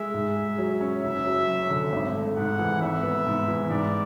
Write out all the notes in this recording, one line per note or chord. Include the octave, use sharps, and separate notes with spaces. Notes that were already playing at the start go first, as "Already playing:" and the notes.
Already playing: G#3 E5
G#2
G#4
F#3
C#4
F#1 E5
F#3
F#2
D3
G#1
A3
G#2 F#5
E3
G#1 E5
B3
G#2
E3
G#2 D5